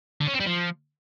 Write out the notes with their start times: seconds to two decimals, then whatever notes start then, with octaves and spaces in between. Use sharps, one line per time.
0.21 D3
0.27 C#4
0.34 C4
0.40 G3
0.47 F3